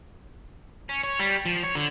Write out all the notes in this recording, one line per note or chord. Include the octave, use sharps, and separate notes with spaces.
C#4
C#5
G3
F3
C#5
D3